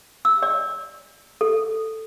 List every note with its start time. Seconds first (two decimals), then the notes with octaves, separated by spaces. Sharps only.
0.25 E6
0.43 D5
1.41 A4